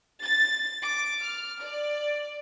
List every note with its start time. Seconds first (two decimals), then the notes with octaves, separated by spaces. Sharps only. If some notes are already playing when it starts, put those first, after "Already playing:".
0.22 A6
0.83 D6
1.21 F6
1.63 D5